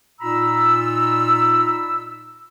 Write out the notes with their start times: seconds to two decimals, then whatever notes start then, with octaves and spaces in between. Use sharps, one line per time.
0.21 A#2 D#4 F4 A#5 B5 E6